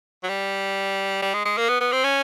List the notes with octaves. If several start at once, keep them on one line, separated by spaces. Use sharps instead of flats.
F#3
G3
G3
G#3
G#3
A#3
B3
B3
C4
C#4